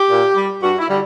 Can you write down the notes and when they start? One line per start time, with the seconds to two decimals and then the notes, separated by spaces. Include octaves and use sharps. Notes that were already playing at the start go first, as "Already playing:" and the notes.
Already playing: G4
0.10 A#2
0.35 G3
0.61 G2 F#4
0.79 E4
0.88 D3 G3